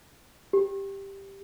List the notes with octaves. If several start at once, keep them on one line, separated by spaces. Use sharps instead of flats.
G4